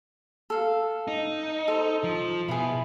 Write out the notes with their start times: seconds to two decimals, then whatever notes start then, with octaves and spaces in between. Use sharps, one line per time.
0.50 A4 F5
1.08 D#4
1.68 A4 C5
2.04 F3
2.48 B2 E4 G#4